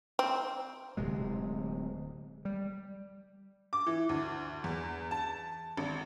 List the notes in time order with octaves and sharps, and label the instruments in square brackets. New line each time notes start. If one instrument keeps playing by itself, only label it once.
[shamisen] C4
[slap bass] D1 C3 G#3
G3
[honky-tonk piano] D6
E3
D2
E2
A5
G#1